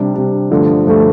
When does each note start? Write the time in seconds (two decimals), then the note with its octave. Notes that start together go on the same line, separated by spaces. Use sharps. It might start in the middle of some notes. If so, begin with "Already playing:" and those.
Already playing: C3 G3 D4
0.14 C3 G3 D4
0.51 G2 D3 F3 A3
0.87 G2 D3 F3 A3